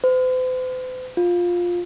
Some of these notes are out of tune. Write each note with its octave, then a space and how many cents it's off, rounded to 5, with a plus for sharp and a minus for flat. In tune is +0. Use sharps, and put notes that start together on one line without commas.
C5 -45
F4 +10